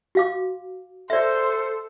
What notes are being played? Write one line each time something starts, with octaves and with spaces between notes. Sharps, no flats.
F#4 F5 D6
A4 C5 D5 E5